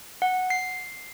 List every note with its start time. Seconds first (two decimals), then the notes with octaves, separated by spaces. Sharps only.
0.22 F#5
0.50 C7